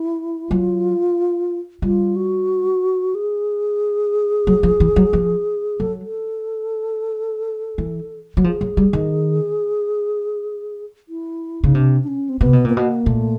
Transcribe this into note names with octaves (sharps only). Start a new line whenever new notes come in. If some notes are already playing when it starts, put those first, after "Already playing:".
Already playing: E4
F#3 F4
G3 F4
F#4
G#4
F#3
F3
E3
F#3
F3
F#3 A4
A4
E3
F#3
F3 G#4
F#3
G3
D#3
E4
C#3 D#4
C3 D4
D4
C#4
C4
C3 B3
B2
A#2 B3
B2 A#3
A#2 A3